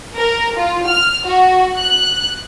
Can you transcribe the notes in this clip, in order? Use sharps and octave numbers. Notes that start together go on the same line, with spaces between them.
A#4
F4
F6
F#4
F#6